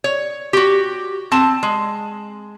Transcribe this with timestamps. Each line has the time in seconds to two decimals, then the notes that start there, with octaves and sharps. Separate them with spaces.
0.04 C#5
0.53 F#4 G4
1.32 C4 A5
1.63 G#3